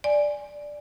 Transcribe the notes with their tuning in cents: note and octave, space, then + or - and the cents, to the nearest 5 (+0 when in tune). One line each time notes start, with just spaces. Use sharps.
D5 +0 G#5 +0